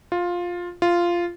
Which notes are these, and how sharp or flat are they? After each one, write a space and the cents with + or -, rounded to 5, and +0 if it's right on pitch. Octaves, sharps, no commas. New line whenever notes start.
F4 +10
F4 -10